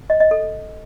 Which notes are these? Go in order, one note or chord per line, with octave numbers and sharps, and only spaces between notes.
D#5
D#5
A4